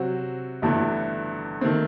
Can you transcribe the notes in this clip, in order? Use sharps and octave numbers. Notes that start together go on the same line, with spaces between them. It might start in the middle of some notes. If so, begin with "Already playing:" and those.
Already playing: C3 F#3 C4 F#4
G1 G2 E3 A3
D#3 A3 C4